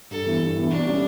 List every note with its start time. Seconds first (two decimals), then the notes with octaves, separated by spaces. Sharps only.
0.11 G2 A4
0.26 E3 B3 E4
0.41 G2
0.56 E3 B3 E4
0.70 B2 D4
0.85 G3 C#4